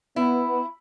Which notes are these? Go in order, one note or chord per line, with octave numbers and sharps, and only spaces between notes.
B3 E4